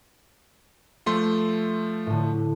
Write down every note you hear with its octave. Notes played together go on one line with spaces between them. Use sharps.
F3 A3 C6
A2 D3